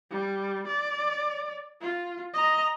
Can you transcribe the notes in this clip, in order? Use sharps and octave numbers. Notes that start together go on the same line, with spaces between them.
G3
D5
F4
D#5 A#5